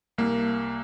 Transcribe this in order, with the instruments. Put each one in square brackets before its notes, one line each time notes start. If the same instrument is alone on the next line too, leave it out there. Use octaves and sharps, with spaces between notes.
[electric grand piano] C2 A#3